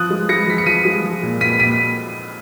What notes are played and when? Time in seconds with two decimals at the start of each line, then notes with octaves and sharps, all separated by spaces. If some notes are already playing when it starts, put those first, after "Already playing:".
Already playing: F3 D#6 F#6
0.10 G#3
0.29 G#3 A#6 C#7
0.48 F3 B6
0.58 C#7
0.66 F3 B6 D#7
0.85 G#3
1.04 F3
1.23 A#2
1.41 A#2 B6 D#7
1.59 A#2 B6 D#7